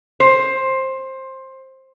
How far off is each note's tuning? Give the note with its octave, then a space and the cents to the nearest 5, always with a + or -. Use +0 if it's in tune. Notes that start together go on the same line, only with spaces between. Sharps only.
C5 +15